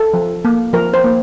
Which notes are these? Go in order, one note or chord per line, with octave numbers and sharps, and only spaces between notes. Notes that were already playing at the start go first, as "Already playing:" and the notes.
Already playing: A4
F3
A#3
F3 A#4
C5
A#3